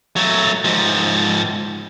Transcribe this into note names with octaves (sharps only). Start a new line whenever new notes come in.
F#3 A3
G#2 F3